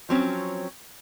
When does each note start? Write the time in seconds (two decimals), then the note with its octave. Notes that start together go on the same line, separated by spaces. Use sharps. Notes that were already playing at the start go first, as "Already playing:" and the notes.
0.09 F3 F#3 C4 C#4